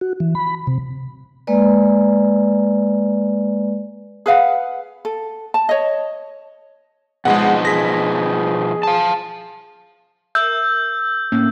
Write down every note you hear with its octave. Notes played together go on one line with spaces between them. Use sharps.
F#4
E3
B5
C3
G#3 A#3 B4 D5
G#4 B4 F5 F#5
A4
A5
C#5 D#5
B2 F3 G#3 D#4 G#4 F#5
G#4 A#6 B6
F5 A5
A#4 E5 E6 G6
A2 A#3 C#4